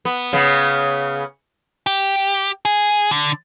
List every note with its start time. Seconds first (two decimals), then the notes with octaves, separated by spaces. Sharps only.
0.05 B3
0.33 C#3 B3
1.87 G4
2.65 G#4
3.11 D3